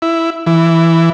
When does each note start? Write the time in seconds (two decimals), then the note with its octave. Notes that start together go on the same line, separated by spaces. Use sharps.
0.02 E4
0.46 E3